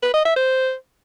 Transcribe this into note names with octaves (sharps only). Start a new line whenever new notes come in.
B4
D#5
E5
C5